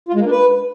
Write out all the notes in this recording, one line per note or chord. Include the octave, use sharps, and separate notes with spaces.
F4
G#3
A#3
D4
B4